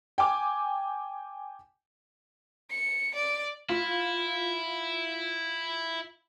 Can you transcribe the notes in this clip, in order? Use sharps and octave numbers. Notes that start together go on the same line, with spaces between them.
G5 G#5 D6
C#7
D5
E4 F4